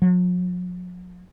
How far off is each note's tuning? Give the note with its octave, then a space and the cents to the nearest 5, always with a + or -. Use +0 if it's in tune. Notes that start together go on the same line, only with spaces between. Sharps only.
F#3 -45